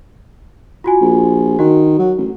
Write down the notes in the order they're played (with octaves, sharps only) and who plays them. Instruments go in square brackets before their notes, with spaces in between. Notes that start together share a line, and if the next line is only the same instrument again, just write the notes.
[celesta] F4 F#4 G#5
[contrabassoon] A#1
[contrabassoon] D#3 [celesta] F#4
[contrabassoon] F#3
A1